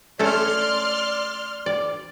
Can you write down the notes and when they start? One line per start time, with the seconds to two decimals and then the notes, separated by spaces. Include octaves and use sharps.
0.19 A3 C#4 A4 D5 C6 F6
1.66 D5